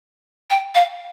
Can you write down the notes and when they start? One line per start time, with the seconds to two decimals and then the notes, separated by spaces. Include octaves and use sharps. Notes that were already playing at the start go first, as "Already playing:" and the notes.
0.50 G5
0.75 F5